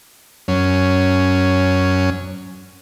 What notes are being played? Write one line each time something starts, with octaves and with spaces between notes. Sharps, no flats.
F#2 C#4